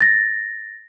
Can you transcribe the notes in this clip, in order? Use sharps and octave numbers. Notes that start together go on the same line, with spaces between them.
A6 A#6